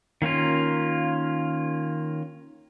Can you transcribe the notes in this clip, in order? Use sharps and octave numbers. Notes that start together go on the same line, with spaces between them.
D#3 A#3 C#4 F4